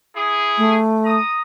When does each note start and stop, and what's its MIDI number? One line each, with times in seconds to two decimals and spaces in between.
0.16 0.79 64
0.16 0.79 68
0.58 1.18 57
1.05 1.41 82
1.05 1.41 87